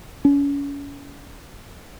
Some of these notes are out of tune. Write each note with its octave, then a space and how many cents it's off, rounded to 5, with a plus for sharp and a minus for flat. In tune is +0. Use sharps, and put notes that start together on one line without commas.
C#4 +35